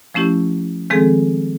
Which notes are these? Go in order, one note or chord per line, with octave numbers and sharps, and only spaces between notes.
F3 A3 C#4 E4 G4
D#3 F3 G#3 C4 G#4 A4